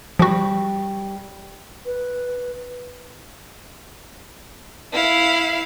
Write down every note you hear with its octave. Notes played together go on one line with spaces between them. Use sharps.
F3 G3 F#4
B4
E4 F5